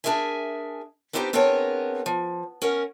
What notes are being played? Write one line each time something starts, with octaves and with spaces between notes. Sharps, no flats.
D4 F4 G#4 A#4 E5 G#5
B3 C4 D4 D#4 G4 C5
B3 C4 D4 G#4 A#4 C#5
F3
C#4 A#4 F#5